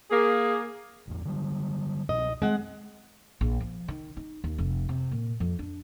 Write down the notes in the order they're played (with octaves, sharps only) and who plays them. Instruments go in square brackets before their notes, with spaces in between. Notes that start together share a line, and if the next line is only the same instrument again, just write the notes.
[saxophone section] A#3 G#4
[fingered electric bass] A1 E2 G2
D3 F#3 G3
[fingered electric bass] C2 B2 C4 [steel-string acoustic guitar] D#5
[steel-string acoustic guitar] G#3 F#5 [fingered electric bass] C4
[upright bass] A#1
F3
D#3
D#4
D#2
F1
C3
A#2
F2
D4